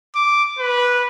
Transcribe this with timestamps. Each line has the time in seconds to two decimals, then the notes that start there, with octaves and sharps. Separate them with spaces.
0.15 D6
0.59 B4